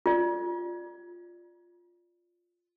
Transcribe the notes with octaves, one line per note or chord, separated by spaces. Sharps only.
F4 D5